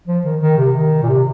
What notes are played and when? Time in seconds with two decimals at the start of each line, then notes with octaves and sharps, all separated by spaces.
0.08 F3
0.24 D#3
0.41 D#3
0.58 C3
0.75 D#3
1.03 A#2
1.08 C3